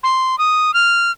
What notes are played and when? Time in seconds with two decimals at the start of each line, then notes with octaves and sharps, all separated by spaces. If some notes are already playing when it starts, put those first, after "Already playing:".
0.03 C6
0.38 D#6
0.74 F6